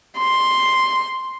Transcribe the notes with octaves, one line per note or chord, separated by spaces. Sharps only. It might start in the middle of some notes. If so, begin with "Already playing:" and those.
C6